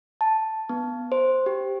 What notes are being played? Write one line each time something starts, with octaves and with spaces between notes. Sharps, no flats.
A5
B3
C5
G4